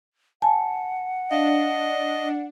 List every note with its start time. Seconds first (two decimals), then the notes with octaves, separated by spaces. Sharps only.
0.42 F#5 G#5 A5
1.31 D4 D#5 F5